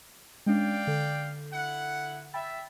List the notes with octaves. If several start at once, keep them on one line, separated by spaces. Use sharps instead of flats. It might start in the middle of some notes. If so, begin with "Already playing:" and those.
G#3 C#4 D4 D5 F5 G5
D3 A4
E4 F#5
E5 G5 B5 A6